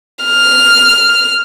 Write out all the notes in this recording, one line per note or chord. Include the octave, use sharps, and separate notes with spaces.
F6